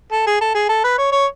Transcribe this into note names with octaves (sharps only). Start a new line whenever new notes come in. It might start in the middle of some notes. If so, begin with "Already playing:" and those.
A4
G#4
A4
G#4
A4
B4
C#5
C#5